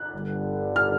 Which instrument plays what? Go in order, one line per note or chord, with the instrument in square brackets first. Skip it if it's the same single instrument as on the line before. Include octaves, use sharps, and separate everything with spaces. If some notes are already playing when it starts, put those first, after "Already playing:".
Already playing: [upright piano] F#6
[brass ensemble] G1 G2 D3 G3
[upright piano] F6